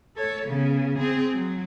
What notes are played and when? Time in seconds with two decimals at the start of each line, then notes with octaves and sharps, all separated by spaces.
0.17 A4 C#5
0.47 C#3 B3
0.98 C4 G#4
1.34 F#3